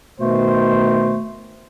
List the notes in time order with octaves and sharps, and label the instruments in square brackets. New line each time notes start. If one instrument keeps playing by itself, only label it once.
[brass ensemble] B2 D#3 C5 [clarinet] A3